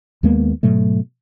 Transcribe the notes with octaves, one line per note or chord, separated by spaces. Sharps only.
D#2 G#3 A#3 B3
G#2 B2 F#3 A3